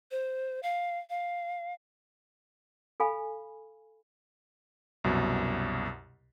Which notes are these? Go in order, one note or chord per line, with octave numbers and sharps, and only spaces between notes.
C5
F5
F5
A4 F5 G#5 B5
C2 F#2 B2